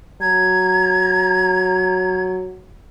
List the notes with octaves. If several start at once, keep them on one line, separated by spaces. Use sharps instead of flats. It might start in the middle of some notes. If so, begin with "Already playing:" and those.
F#3 A#5 G#6